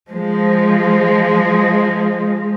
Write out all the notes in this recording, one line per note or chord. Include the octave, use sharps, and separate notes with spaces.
F3 G#3